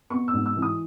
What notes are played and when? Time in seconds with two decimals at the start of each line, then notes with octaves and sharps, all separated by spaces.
0.10 B3 C#6
0.28 E6
0.33 G#2
0.46 E6
0.57 E3
0.62 D#6